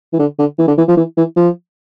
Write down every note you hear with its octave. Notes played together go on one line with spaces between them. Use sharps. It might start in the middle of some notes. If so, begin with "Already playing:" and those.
E3
D3
D3
E3
D3
E3
F3
E3
E3
F3